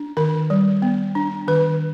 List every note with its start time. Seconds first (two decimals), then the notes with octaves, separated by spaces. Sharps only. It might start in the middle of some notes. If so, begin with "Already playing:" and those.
Already playing: D4
0.17 D#3 A#4
0.50 G3
0.82 B3
1.15 D4
1.48 D#3 B4